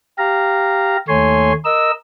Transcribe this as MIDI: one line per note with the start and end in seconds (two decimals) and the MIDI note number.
0.18 0.97 67
0.18 0.97 77
0.18 0.97 82
1.08 1.53 39
1.08 1.53 57
1.08 1.53 73
1.08 1.53 80
1.08 1.53 84
1.65 1.91 70
1.65 1.91 75
1.65 1.91 88